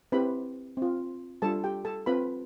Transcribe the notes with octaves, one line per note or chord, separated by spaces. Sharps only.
C4 E4 G4 B4 B5
C4 F4
G3 D4 F4 A4 A5
G4 G5
A4 A5
C4 F4 B4 B5